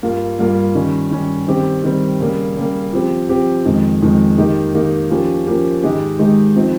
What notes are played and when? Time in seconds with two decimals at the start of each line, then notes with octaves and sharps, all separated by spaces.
0.03 G2 G3 A#3 F4
0.39 G2 G3 A#3 F4
0.75 D#3 G3 C#4
1.11 D#3 G3 C#4
1.48 D#3 G3 C4 G4
1.84 D#3 G3 C4 G4
2.20 C#3 G3 A#3
2.57 C#3 G3 A#3
2.93 F3 C4 G4
3.29 F3 C4 G4
3.65 F2 D#3 G#3
4.02 F2 D#3 G#3
4.38 D#3 A#3 D#4 G4
4.74 D#3 A#3 D#4 G4
5.10 F3 A#3 C#4 G4
5.47 F3 A#3 C#4 G4
5.83 G#2 D#3 G#3 D#4 G4
6.19 G#2 D#3 G#3 D#4 G4
6.56 F3 C4 D#4